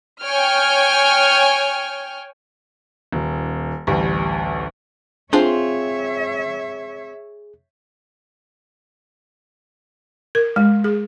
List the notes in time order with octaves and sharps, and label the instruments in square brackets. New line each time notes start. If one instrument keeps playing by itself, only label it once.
[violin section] C#5 G5 G#5 F6
[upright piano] D#1
A1 D2 G3
[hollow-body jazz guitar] C4 F4 C5 [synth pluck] D4 [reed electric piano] G#4 [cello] C#5 E5
[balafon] A#4
G#3
G#4